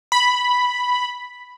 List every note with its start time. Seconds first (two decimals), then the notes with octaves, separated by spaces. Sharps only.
0.12 B5